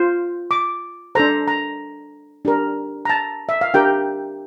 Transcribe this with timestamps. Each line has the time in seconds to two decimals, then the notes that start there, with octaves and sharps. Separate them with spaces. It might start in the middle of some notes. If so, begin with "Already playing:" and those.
Already playing: F4 C5
0.51 D6
1.15 D4 A4 C5 A#5
1.48 A#5
2.45 D4 G4 A#4
3.05 A#5
3.10 A5
3.49 E5
3.61 F5
3.74 D4 G4 A#4 G5